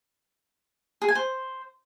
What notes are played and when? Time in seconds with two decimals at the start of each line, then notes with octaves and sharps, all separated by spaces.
1.02 G#4
1.08 G#5
1.15 C5